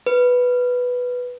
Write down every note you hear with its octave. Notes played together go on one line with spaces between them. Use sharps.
B4